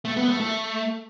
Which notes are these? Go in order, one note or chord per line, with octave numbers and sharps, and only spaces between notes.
A3
B3
A3
A3